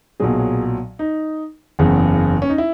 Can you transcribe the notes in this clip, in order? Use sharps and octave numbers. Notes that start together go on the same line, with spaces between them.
B1 A#2 F#3 G#4
D#4
F#1 E2 C#3
C#4
D#4
E4